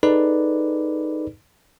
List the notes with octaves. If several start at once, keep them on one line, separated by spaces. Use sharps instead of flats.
D#4 G#4 A4 B4 D5